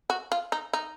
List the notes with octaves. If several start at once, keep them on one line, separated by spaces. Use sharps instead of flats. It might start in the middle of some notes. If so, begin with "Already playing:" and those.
F#4
F4
D#4
D#4